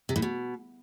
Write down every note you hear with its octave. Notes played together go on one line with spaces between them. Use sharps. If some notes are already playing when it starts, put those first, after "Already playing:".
C3
A2
B2